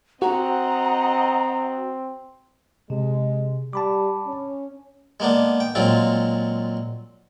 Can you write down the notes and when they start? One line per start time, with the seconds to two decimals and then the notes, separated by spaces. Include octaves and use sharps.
0.22 C4 F#4 D#5 F#5 A#5
2.90 C3 G#3
3.73 G3 A5 B5 D6
4.27 C#4
5.20 G#3 A#3 B3 D4
5.60 G5
5.75 A#2 F#3 G#3 C4 F4